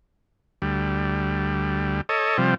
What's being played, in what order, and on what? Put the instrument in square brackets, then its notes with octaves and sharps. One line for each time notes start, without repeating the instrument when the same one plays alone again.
[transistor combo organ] D2 G3
A4 C#5 D#5
C3 F3 G3